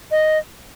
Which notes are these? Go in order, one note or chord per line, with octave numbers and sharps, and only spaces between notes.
D#5